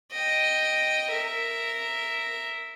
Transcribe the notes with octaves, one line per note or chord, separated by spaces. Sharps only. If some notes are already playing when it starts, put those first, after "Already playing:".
D#5 G5
A#4 E5